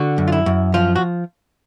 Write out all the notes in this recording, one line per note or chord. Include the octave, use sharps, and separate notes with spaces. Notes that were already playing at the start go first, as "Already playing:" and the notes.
Already playing: D3 F#4
F#2
F4
E4
F#2
F3 F4
F#4